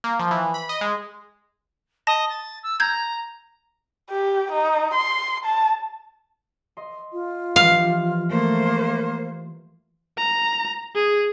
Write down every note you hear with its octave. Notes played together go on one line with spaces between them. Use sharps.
A#3
F3
E3
B5
D#5
G#3
D#5 A5 A#6
A6
E6
A#5 G6 G#6
G4
D#4
C6
A5
D#5 C6
F4
E3 F3 G3 F5
A3 A#3 C5
A#5
G#4